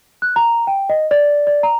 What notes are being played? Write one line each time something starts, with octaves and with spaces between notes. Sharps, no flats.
F#6
A#5
G5
D#5
D5
D5
A#5